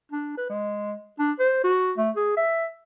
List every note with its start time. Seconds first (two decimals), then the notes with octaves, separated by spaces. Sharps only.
0.12 D4
0.38 B4
0.50 G#3
1.19 D4
1.39 C5
1.64 F#4
1.97 A3
2.17 G#4
2.37 E5